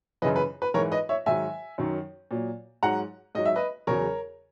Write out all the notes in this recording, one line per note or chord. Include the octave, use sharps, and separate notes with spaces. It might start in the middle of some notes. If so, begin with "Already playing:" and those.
F#2 C#3 E3 B4 D#5
B4
B4
G#2 E3 A#4 C#5
B4 D#5
C#5 E5
G#2 D#3 F#3 E5 G#5
F#2 D#3 F#3
A#2 F#3
G#2 F#3 F#5 A#5
G#2 F#3 D#5
E5
B4 D#5
E2 C#3 F#3 A#4 C#5